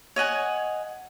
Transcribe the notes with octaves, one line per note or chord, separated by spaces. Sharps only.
C#5 D#5 F#5 G#5